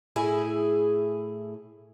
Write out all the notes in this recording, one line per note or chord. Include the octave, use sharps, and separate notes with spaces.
A2 E4 G#4